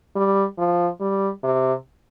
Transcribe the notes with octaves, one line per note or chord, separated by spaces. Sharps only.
G3
F3
G3
C3